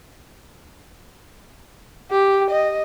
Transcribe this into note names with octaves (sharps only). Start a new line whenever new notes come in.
G4
D#5